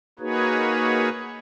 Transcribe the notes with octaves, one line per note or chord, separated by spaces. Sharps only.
A#3 D#4 F#4 G#4 B4 C#5